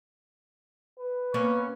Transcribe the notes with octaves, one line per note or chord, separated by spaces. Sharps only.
B4
A#3 B3 C#4 C#6